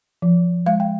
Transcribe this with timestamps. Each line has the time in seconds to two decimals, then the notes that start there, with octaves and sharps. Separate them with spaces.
0.22 F3
0.66 G#3 F5
0.80 G5